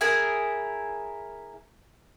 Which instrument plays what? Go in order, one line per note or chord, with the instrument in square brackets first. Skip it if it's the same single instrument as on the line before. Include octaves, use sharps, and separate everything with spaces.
[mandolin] E4 G#4 A#4